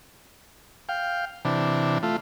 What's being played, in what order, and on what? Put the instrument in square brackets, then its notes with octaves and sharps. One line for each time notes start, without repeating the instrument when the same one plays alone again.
[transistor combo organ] F5 G5
C3 E3 D4
A3 F4